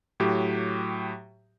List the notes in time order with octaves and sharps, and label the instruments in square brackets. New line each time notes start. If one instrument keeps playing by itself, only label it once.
[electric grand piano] A2 F#3 G4